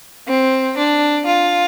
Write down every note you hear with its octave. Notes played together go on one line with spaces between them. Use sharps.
C4
D4
F4